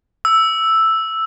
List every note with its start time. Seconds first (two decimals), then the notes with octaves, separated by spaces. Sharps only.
0.25 E6